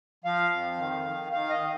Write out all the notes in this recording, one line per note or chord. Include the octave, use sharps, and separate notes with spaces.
F3 F5
F2
D#3
D#3
D#3 F5
D#5
D#3